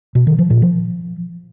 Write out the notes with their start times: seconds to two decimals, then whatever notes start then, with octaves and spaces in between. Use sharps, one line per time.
0.15 B2
0.27 D#3
0.39 F3
0.50 A#2
0.62 F3